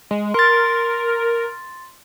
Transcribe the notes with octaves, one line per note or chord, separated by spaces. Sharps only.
G#3
A#4 C6 A6